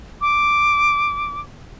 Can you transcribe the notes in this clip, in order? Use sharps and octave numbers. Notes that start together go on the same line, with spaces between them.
D6